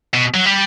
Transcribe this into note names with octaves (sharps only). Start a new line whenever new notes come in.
B2
F#3
G3